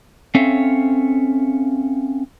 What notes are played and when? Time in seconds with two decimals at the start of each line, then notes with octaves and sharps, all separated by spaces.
0.35 C4 C#4 A4 C#5 E5 F5